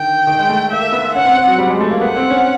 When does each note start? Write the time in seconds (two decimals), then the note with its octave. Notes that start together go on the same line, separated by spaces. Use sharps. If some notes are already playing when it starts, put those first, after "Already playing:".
Already playing: D3 D#3 G5
0.27 D#3
0.39 G#3
0.49 A3
0.71 A#3 E5
0.92 B3
1.14 C#4 F#5
1.25 C4
1.37 C4
1.47 F#3
1.58 G3
1.69 G#3
1.81 A3
1.91 A#3
2.01 B3 F#5
2.16 C4
2.30 C#4